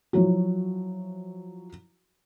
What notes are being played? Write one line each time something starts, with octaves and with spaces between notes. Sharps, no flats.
F3 F#3 E4 F#4